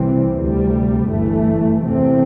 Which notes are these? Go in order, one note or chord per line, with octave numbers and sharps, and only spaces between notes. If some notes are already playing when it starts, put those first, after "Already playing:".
Already playing: C2 C3 E3 G3 C4
D2 C3 G3
G1 G2 E3 A3
E2 C3 A3 C4